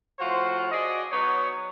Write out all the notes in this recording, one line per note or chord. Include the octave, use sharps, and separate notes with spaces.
A2 F3 F4 F#4 C5
F#4 G#4 D5 D#5
F#3 B3 D#4 C#5